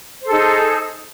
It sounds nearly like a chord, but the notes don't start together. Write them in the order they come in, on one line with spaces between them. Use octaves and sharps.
C5 A4 G#4 D#4